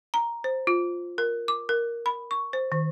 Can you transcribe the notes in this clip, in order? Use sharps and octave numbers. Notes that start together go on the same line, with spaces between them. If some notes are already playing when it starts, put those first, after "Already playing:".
A#5
C5
F4
A#4
D6
A#4
B5
C#6
C5
D#3